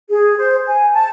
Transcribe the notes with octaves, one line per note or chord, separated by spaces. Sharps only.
G#4
C5
G#5
A5